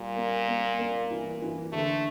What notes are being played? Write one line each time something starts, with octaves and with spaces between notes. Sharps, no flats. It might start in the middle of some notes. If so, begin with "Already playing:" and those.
Already playing: A#2 G3
A#3
A#3
A#3
E3
E3
D3 A3